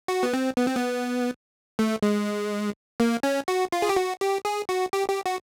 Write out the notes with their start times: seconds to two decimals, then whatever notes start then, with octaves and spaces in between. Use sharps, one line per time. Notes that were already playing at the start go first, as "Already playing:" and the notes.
0.08 F#4
0.23 B3
0.33 C4
0.57 B3
0.67 C4
0.76 B3
1.79 A3
2.03 G#3
3.00 A#3
3.23 C#4
3.48 F#4
3.72 F4
3.82 G#4
3.89 G4
3.96 F#4
4.21 G4
4.45 G#4
4.69 F#4
4.93 G4
5.09 G4
5.26 F#4